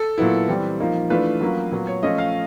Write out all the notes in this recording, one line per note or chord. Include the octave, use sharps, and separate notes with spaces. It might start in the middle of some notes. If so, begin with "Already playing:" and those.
Already playing: A4
A#2 F#3 B3 E4
E3 G3 C4
F3 A#3 D#4
E3 A3 D4 F4 B4
F#3 A#3 C#4 F4
A#2 F#3 B3
C#5
F3 A3 C#4 F4 D#5
F5